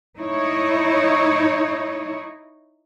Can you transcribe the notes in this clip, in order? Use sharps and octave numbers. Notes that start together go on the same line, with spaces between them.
D#4 E4 C#5